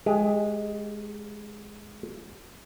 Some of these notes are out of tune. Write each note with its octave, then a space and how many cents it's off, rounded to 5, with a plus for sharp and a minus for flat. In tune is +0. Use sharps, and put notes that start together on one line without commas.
G#3 +10 G4 +35